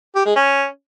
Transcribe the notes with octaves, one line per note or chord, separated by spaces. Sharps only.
G4
G#3
C#4